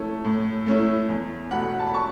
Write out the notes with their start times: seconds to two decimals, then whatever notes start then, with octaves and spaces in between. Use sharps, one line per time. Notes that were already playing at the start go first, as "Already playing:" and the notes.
Already playing: A3 C#4 E4 C#5 A5
0.25 A2
0.66 A3 C#4 E4
1.09 E2
1.51 B2 A3 F#5 B5
1.79 A5
1.87 B5
1.94 A5 C#6